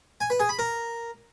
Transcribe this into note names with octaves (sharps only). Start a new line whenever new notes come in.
G#5
B4
G#4
B5
A#4